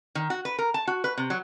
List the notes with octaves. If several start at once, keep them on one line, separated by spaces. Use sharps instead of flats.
D#3
F#4
B4
A#4
A5
F#4
B4
C3
F#3